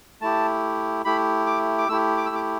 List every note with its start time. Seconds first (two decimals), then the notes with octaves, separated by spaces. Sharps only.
0.21 A3 E4 G4 A5
1.05 A3 E4 G4 B5
1.46 D6
1.78 D6
1.89 A3 E4 G4 E6
2.17 D6
2.26 E6
2.35 D6